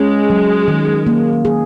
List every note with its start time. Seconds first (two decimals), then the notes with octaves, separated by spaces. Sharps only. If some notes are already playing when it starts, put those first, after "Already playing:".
Already playing: G#3 C#4
0.30 F#3
0.68 D#3
1.07 A#3
1.45 G#4